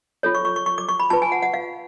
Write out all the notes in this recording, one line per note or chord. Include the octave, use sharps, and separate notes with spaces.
F4 A4 C#5
C#6
C#6
C#6
C#6
D6
C#6
B5
F4 B4 A5
G#5
F#5
F#5
F5